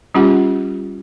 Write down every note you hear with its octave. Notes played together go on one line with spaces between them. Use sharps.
G3 C#4 F4 G4 F#5